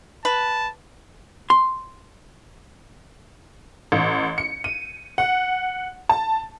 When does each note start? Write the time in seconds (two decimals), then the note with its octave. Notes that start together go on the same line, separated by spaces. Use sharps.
0.25 B4 A5
1.50 C6
3.92 A1
4.38 C#7
4.64 D#7
5.18 F#5
6.09 A5